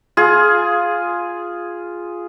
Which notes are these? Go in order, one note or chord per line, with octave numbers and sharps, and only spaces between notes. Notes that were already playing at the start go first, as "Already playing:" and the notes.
F4 G#4